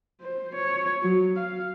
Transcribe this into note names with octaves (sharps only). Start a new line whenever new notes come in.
C5
C#5
F#3
F5